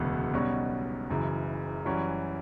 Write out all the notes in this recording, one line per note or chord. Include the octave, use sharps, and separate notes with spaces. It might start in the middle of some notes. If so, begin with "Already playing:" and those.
Already playing: E1 D2 C#3 F#3 B3
B1 B2 G3 C#4 F#4
F#1 F#2 C#3 E3
F#2 E3 G3 C#4 F#4